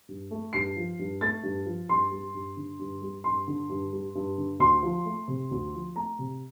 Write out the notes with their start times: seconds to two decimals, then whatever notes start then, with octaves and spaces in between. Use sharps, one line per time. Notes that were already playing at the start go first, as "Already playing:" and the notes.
0.08 G2
0.31 A3
0.53 G2 C7
0.76 F3
0.99 G2
1.21 A3 A6
1.43 G2
1.66 F3
1.89 G2 C6
2.11 G3
2.34 G2
2.57 D3
2.79 G2
3.02 G3
3.24 G2 C6
3.47 D3
3.69 G2
3.93 G3
4.15 G2
4.38 D3
4.59 D2 C6
4.83 F3
5.05 A3
5.28 C3
5.51 D2
5.74 F3
5.95 A3 A#5
6.19 C3